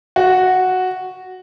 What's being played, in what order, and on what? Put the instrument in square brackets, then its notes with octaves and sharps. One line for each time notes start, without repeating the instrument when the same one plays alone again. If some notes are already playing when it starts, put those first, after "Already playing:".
[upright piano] F#4